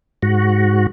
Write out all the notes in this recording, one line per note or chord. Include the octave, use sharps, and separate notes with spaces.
G#2 F#4